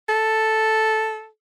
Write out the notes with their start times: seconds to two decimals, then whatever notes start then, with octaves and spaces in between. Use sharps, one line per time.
0.09 A4